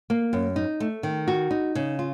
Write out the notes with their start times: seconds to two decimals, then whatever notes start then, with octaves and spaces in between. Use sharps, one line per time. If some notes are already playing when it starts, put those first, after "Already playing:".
0.10 A#3
0.33 F#2
0.56 D#4
0.80 A3
1.03 D#3
1.28 F#4
1.51 D#4
1.75 C#3
1.99 F4